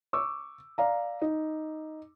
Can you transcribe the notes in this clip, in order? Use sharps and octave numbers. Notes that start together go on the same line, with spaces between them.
C#6 D6 E6
D5 F5 A#5
D#4